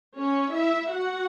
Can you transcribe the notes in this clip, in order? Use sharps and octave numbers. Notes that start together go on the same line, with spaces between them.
C#4 C#5
E4 E5
F#4 F#5